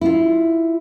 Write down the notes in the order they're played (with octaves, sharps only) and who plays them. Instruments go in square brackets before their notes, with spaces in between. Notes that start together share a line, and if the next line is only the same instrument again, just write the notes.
[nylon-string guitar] E4 F4